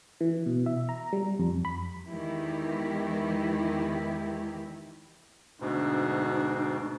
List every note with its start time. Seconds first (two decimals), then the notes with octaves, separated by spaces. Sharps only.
0.21 E3
0.46 B2
0.66 E5
0.89 A#5
1.13 G3
1.39 F2
1.65 B5
2.07 E2 D#3 E3 G#3 E4 G4
5.60 D2 G#2 B2 D4